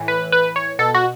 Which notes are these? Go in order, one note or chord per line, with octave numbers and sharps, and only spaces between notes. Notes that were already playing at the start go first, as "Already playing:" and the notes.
Already playing: A2 E3
B4
B4
C#5
B2 A4
F#4